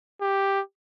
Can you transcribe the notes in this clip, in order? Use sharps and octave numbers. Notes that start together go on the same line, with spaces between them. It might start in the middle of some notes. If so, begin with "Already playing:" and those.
G4